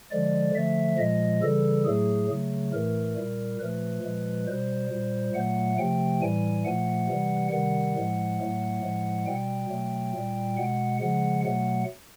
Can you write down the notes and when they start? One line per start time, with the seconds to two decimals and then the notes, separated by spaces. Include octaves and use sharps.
0.11 D3 F3 G#3 D5
0.54 D3 F3 A3 E5
0.98 A#2 F3 G#3 D#5
1.42 C#3 E3 G3 A4
1.85 A2 F#3 A3 G#4
2.29 C#3 F#3 A3
2.73 A2 E3 A3 A#4
3.16 A#2 G3
3.60 A#2 F3 A3 B4
4.03 A#2 F3 G#3
4.47 B2 G3 C5
4.91 A#2 G3
5.34 A#2 F#3 A3 F#5
5.77 C3 F3 A3 G5
6.21 A2 E3 G3 G#5
6.64 A#2 F3 A3 F#5
7.09 C3 E3 G3
7.52 C3 D#3 G3 F#5
7.96 A2 F3 G#3
8.39 A2 F#3 A3
8.83 A2 F3 G#3
9.26 B2 G3 G5
9.70 B2 F#3 A3
10.14 A#2 G3
10.57 B2 G#3 F#5
11.01 C#3 F3 G#3 F#5
11.44 B2 F#3 A3 F#5